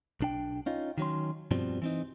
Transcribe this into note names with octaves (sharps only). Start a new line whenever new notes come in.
B1 D4 G5
C#4 D#4 F4
D#3 F#3 C#4 C6
G2 B2 F3 G3 C4
E3 C4 D#4